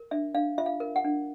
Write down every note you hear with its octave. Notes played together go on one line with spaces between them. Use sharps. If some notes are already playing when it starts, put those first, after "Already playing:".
Already playing: A#4
D4 E5
D4 F5
F4 E5
F5
A#4
F#5
D4